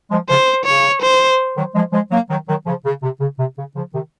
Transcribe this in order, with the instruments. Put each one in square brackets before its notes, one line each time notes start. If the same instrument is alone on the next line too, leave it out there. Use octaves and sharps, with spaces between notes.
[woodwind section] F3 G#3
[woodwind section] C#3 F3 [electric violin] C5
[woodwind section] C#3 [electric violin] C#5
[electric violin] C5
[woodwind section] D#3 F#3
F3 G#3
F3 G#3
F#3 A#3
D#3 F#3
D#3 F#3
C#3 F3
C#3
C3
C#3
C3
C#3
C#3 F3
C3 D#3